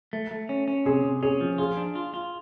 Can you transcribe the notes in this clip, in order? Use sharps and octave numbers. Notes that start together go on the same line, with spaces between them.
A3
A3
C#4
C#4
C3 G#4
C3
C#4 G#4
F3
F4 G#4
D4
F4
F4